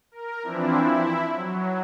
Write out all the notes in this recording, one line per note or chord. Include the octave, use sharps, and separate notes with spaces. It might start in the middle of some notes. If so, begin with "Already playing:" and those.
A#4
E3 F3 C4 D4 E4
E4
F#3